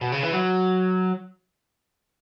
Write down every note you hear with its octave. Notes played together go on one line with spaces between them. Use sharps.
B2
C#3
E3
F#3